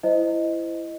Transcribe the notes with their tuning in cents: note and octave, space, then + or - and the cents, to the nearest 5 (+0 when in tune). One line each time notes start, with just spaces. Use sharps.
E4 +20 C5 -20 D#5 +0